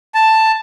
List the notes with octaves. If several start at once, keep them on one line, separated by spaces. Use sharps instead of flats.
A5